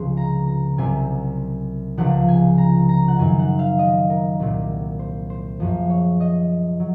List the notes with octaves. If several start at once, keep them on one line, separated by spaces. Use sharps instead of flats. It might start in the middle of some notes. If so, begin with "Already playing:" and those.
Already playing: C#2 C3 F3 G#3 G#5 C6
A#5
A#5
C2 C3 F#3 G#5
C#2 C3 F3 F#5
G#5
A#5
A#5
F#5
F#2 D#3 F#3 G#5
F#5
F5
D#5
A#4
C2 A#2 F#3
C5
C5
F#2 F3 G#3
C#5
D#5
F#3